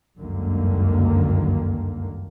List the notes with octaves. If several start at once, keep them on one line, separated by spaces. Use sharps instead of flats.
G1 C#2 F#2 D3 D#3 A#3